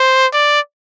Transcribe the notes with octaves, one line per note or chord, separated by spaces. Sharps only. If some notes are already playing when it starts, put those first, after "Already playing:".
Already playing: C5
D5